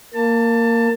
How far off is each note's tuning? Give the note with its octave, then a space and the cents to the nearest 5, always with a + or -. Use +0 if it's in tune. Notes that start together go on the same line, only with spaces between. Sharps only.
A#3 -10 A5 +20